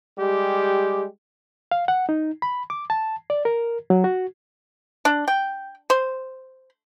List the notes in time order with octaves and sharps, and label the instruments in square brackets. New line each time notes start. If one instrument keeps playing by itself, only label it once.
[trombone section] G3 G#3 G4
[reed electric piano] F5
F#5
D#4
B5
D6
A5
D5
A#4
F#3
F#4
[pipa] D4
G5
C5